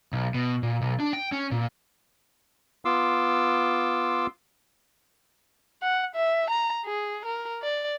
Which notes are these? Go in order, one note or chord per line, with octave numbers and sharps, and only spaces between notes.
B1
B2
A#2
B1
D4
G5
C#4
A#2
B3 F4 C6 D6 E6
F#5
E5
A#5
G#4
A#4
D5